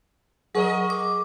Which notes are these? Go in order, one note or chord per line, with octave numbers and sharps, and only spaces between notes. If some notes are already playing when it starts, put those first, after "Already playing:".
F#3 G#4 A#4 D#5 C#6
D6